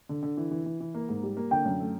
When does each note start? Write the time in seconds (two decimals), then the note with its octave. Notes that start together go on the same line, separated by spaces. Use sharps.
0.09 D3
0.23 D3
0.37 E3
0.51 E3
0.66 E3
0.80 E3
0.95 A#3
1.09 G#2
1.23 G3
1.37 A#3
1.51 D3 G5
1.66 F#2
1.80 A3